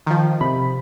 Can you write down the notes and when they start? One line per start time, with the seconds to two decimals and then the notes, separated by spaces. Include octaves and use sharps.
0.07 D#3 F3
0.41 C3 B5